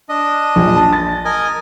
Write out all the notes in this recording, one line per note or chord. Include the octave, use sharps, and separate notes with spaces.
D4 D#5
A#1
A5
A6
A#4 D#5 G#5